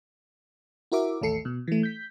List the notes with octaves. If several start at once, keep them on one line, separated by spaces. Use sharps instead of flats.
E4 F#4 A#4 E5 D6
A1 D#2 A3 A4 C7 C#7
B2
E3 A3
G6 B6